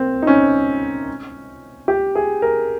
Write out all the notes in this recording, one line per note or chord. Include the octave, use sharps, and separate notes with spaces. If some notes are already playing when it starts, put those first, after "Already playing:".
Already playing: A#3 C4
D#4
C#4
G4
G#4
A#4